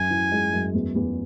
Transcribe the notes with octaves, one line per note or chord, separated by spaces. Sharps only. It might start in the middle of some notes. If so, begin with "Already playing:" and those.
Already playing: F#2 G#5
E3
G#3
F#2
E2
E2